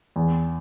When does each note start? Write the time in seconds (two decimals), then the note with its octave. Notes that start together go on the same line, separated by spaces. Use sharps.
0.16 E2